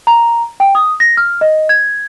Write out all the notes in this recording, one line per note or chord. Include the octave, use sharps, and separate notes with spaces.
A#5
G5
D#6
A#6
F6
D#5
G#6